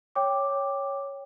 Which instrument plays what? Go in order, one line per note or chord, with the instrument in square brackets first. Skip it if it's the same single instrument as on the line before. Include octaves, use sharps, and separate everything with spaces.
[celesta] C#5 G5 D6